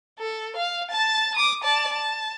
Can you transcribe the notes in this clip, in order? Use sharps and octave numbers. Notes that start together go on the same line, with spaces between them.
A4
F5
A5 A6
D6 D#6
D5 A5
A5